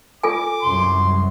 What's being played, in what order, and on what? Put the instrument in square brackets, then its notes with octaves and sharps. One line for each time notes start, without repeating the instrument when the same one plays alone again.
[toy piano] F4 A4 G#5 [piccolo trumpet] D6
[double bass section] C2 F#2 [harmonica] C6